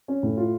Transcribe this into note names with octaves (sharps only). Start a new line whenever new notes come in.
C#4
A2
F4